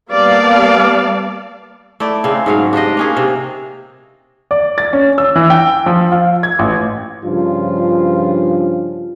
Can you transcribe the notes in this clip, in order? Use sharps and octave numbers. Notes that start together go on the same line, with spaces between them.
G3 A#3 B3 D5 F5 A5
A3 E4 D5
C#3 C4
G#2 F#3 F5
D4 G4 C5 D#5
A#3 C#4 G#4
C3
D5
A6
C#4
E6
E3
G5
F3
F4
G#6
A1
G2 C#3 F3 F4